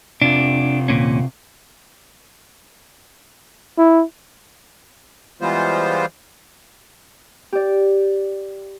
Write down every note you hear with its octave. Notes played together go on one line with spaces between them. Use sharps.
C3 D4 F4
D#2 A#2 C#4
E4
E3 G3 G#3 B3 F4 C5
G4 D5